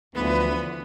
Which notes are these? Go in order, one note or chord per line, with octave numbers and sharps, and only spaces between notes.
D2 D3 E3 F3 B3 B4